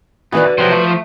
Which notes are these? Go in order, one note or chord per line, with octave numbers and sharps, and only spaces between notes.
D#3 E3 B3 F#4 B4 D5
D3
C3 F3 F#3 C4 C5
A3